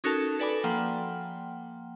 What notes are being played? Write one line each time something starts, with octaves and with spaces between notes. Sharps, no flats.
C#4 D#4 F#4 A4 A#4 A5
A4 B4 D5 G#5 B5 D6
F3 A#3 F#5 G5